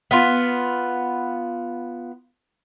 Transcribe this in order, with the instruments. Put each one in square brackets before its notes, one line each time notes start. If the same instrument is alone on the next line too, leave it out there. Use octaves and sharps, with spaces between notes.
[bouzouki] B3 F4